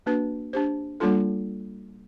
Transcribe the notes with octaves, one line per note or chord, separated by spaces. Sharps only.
A#3 D4 F#4 B4
D4 G4 C5
G3 A#3 D4 F4 A4